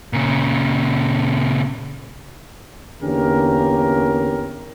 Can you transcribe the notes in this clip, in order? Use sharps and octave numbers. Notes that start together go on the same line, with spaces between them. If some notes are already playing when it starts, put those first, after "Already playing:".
A#2 C#3
E2 D3 A#3 C#4 G4 A#4